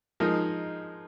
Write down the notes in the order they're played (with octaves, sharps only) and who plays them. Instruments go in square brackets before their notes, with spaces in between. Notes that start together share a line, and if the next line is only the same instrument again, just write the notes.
[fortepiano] F3 G#3 D#4 A#4 D#5